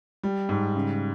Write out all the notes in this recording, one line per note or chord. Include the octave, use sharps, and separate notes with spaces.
G3
G#2
C#3